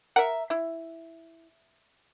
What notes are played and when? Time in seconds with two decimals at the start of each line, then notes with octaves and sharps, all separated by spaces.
0.16 A#4 E5 F#5
0.50 E4